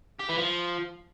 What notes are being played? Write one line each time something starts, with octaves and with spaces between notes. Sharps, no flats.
G4
E3
F3